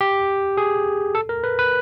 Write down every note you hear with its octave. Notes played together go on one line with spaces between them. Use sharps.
G4
G#4
A4
A#4
B4
B4